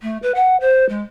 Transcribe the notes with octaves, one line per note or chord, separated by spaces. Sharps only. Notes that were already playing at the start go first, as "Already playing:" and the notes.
A3
B4
F#5
C5
G#3